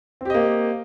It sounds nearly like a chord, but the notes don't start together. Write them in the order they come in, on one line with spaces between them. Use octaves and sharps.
C4 G4 D#5 A#3